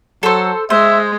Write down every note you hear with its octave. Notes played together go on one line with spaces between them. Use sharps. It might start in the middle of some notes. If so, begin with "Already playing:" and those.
F#3 A4 C5
G#3 C5 E5